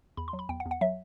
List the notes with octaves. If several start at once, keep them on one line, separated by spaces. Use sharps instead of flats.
E2 B5
C6
F#3
B5
E2 G5
F#5
E2
F#5
F#3 E5